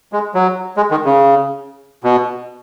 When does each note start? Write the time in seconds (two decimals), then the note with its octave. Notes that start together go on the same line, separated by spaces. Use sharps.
0.13 G#3
0.35 F#3
0.77 G#3
0.91 D#3
1.05 C#3
2.04 B2